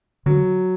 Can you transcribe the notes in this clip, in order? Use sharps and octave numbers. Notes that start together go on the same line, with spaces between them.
D3 F#3